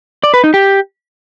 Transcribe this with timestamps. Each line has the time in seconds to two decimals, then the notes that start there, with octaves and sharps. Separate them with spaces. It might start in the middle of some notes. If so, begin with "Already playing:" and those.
0.24 D5
0.34 B4
0.44 D#4
0.54 G4